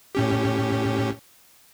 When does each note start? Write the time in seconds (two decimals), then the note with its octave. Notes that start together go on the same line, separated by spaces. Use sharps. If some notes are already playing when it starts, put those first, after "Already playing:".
0.15 A2 C#4 G4